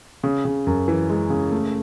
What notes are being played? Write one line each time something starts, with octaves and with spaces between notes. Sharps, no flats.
C#3
C#3
F#2
E3
G#3
C#3
A3